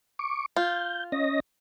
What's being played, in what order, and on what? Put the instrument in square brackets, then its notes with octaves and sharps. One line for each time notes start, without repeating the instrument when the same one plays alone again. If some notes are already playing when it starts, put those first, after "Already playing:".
[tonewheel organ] C#6 D6
[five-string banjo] F4 [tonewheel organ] G6
[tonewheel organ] C#4 D#5 A#6